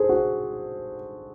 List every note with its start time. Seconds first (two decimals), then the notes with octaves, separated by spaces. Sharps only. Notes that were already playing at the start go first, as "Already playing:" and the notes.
Already playing: G#4 A4 C5
0.09 F#4